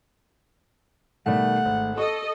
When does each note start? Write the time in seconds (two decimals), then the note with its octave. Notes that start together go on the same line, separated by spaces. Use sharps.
1.26 B2 D#3 G3 A3 F#5
1.65 G#1
1.98 A4 D#5 C#6